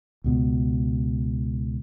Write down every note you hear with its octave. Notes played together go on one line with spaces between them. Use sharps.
C#2 B2